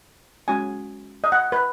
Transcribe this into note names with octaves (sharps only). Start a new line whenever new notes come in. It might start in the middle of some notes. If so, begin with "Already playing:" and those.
G#3 C#4 F#4 G#5
D#5
F#5
B4